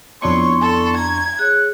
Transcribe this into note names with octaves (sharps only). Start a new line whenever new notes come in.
F2 B3 D4 E4 C#5 C6 C#6
A4
A#5 G#6
G#4 C#5 F#6